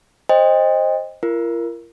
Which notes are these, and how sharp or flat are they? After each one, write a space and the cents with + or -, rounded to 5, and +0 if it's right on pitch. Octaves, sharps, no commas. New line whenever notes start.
C5 +10 D#5 +0 G5 +30
F4 -45 A#4 +0